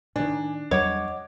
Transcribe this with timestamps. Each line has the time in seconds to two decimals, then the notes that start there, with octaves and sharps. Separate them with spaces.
0.16 A2 D#3 D4 D5 G#5
0.71 E2 F#3 G3 C#5 D#5 F#5 D6